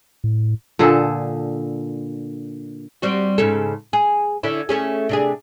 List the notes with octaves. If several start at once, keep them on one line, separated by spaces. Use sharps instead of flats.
A2
A#2 D3 G#4 A4
G3 C4 F#4
G#2 C#3 A4
G#4
D3 C#4 E4
A3 C#4 G#4
C3 D4 G#4